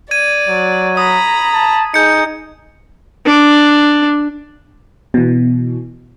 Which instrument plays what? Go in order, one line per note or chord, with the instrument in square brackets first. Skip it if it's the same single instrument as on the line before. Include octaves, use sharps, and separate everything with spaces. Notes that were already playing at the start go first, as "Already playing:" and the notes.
[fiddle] D5 [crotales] G#6 D#7
[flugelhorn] F#3
[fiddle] A#5 B5 [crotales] D#6
[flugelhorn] A5
[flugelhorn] D#4 [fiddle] G#4 [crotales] G6 C#7
[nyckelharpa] D4
[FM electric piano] B2 E3